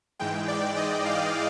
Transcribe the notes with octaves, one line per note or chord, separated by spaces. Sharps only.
G#2 E3 G#3 G5
D5
D#5
F5